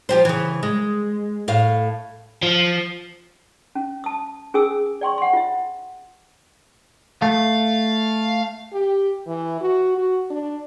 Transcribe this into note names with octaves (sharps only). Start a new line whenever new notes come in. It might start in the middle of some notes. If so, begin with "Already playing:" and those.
F3 G4 C5
C#3 E3
G#3
A2 F5
F3
C#4
A5 D#6
C#4 G#4 A#4 G#5 D#6 E6
D5 G5 C6 C#6
F#5 C6
F4 E5
A3 F5
G4
E3
F#4
F#4
D4